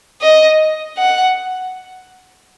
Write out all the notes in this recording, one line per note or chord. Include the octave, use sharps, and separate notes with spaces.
D#5
F#5